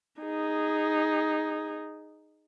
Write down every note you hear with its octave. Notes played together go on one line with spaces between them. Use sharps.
D#4 G#4